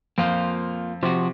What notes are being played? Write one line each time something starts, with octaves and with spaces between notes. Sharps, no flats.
F2 A#3 F4 C5
C3 F3 F#4